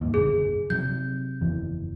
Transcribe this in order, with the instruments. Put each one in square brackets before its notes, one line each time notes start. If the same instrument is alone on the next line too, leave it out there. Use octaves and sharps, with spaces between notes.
[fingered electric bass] D#2 G#2
[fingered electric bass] F#1 B1 D3 [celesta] G#4
[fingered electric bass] C3 F#3 [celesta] G6
[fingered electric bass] F#1 E2 E3